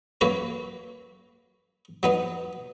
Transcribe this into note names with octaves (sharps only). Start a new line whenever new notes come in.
F#2 A#3 B4 C#5 A#5
F#3 B3 D#4